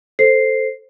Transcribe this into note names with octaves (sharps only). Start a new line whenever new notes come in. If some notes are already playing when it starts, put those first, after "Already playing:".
A4 C5 C7